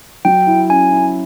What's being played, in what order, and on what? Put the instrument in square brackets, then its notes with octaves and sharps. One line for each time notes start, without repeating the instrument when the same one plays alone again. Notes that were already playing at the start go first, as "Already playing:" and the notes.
[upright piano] F#3 [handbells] G5
[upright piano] E4
[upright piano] C#4 [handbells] G#5
[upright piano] E4